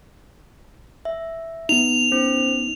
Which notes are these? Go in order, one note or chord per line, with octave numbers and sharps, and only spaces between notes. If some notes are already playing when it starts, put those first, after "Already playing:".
E5
B3 D#4 F7
C#4 C5